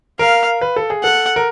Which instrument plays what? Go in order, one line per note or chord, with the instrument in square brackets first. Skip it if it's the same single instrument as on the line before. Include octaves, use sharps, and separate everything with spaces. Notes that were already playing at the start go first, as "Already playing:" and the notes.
[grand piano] A#4 [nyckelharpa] F5
[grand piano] B4
A4
G#4
[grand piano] A4 [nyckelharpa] F#5
[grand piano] A#4